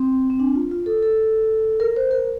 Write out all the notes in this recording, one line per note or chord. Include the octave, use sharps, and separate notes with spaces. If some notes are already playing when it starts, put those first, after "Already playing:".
Already playing: C4
C4
D4
F4
F4
A4
A4
A#4
C5
A#4